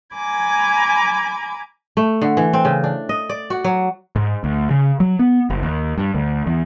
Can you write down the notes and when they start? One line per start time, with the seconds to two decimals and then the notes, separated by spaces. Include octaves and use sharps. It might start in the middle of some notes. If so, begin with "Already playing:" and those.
0.15 G#5 A#5 B5 D6 G#6
1.97 A3
2.22 D3
2.37 E3
2.53 C4
2.65 C#3
2.84 D4
3.09 D#5
3.29 D5
3.50 F#4
3.64 F#3
4.16 G#2
4.44 D2
4.70 C#3
5.00 F#3
5.19 B3
5.50 F#1
5.63 D#2
5.98 G2
6.15 D2
6.46 E2